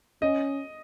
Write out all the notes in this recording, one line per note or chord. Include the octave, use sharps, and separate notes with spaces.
C#4 D#5